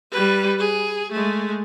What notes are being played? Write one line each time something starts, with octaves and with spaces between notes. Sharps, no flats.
G3 B4
G#4
G#3 A3